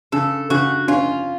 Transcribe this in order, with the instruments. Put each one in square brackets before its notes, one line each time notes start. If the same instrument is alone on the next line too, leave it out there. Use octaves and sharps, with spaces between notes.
[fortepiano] C#3 [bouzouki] A4
[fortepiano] C#3 [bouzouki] F#4
[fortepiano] C#4 [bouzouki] F4